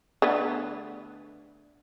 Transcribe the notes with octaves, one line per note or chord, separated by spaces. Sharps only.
D3 A3 B3